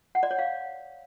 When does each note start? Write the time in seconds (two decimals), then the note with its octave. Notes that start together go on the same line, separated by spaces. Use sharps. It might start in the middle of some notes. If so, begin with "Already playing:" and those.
0.15 F#5
0.23 D5
0.31 C#5
0.39 F5